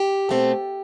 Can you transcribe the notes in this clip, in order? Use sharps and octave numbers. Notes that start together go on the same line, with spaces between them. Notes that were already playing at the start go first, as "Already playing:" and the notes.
Already playing: G4
B2 A3 C4